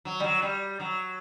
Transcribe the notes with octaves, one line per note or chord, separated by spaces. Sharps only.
F#3
G3
F#3
G3
F#3